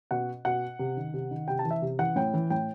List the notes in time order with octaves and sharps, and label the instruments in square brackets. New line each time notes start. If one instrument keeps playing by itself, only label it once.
[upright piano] B2 F#5
B2 F#5
C3
D#3
C3
D#3
C3 G5
A5
E3
E5
C3
E3 F#5
A2 G5
E3
A2 G5